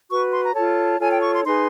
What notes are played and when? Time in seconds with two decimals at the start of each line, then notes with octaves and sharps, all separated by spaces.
0.09 F#4 B4 C#6
0.31 C6
0.43 A#5
0.54 F4 A4 C#5 A5
0.99 F4 A4 C#5 G#5
1.11 G5
1.22 C#6
1.33 C6
1.44 D#4 G#4 B4 C6